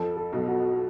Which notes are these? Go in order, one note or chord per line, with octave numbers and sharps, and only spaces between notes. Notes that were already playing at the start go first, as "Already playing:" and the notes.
Already playing: F2 F3 A4
A4
B1 B2
F#4